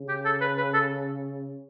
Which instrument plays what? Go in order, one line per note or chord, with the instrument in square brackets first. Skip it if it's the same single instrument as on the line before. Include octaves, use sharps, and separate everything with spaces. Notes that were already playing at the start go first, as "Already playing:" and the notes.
Already playing: [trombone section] C#3
[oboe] G4
A4
B4
B4
A4